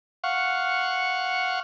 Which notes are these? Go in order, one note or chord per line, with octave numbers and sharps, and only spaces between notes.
F5 F#5 C#6